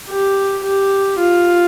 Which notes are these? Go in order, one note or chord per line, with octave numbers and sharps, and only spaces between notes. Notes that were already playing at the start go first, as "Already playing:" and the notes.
G4
G4
F4